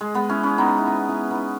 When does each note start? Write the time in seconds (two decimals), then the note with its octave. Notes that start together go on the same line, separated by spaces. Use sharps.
0.01 G#3
0.14 G#3 B3
0.29 C#4 E4
0.43 C#4 E4
0.58 B3 D#4
0.78 E4
0.87 B3 D#4
1.09 C#4 E4
1.31 B3 D#4